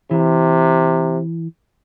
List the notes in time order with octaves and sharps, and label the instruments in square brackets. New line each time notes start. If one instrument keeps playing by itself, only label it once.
[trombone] C3 [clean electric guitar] E3